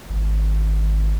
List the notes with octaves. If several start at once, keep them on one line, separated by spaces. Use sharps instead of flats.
G#1